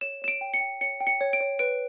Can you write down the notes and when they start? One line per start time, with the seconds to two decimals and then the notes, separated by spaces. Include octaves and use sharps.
0.01 C#5 E7
0.22 C#5 E7
0.28 D7
0.41 G5
0.54 C#7
0.61 G5
0.81 C#5 C#7
1.00 G5
1.07 C#7
1.21 C#5
1.33 D7
1.40 C#5
1.59 B4 D7